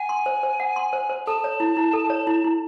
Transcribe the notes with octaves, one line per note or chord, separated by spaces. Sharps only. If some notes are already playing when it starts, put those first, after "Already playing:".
Already playing: F#5 G#5
C6
C5
C5
F#5
C6
C5
C5
A4 A5
C#5
E4
E4
A4
C#5
E4
E4